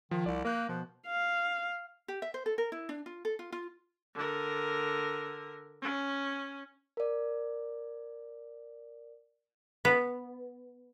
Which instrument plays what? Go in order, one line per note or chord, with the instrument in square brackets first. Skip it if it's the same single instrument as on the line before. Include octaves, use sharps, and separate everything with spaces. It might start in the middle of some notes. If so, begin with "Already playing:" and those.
[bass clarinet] D#3 [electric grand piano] F3
[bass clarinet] C2 [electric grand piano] D5
[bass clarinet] A#3 [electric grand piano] A#4 F#6 G6
[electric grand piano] B2 [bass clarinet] F3
[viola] F5
[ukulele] G4
E5
C5
A4
A#4
E4
D4
F4
A4
F4
F4
[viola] D3 A#4
C#4
[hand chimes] A#4 D5
[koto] B3